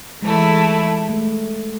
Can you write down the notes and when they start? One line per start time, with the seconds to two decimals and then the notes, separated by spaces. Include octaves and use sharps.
0.22 E3 G#3 A3 E4
1.10 A3